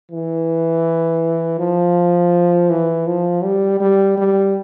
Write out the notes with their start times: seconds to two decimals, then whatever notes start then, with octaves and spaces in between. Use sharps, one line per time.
0.12 E3
1.59 F3
2.70 E3
3.07 F3
3.44 G3
3.80 G3
4.17 G3